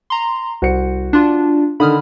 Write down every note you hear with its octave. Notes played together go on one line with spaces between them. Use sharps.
A#5 C6
C2 F#4 C5 C#7
D4 F4
D3 D#3 B5 D#6 F6